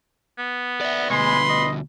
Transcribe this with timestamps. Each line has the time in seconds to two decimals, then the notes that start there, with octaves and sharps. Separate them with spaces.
0.38 B3
0.81 D5 E5
1.10 D2 B2 G#3 B4 B5 C6
1.49 D#5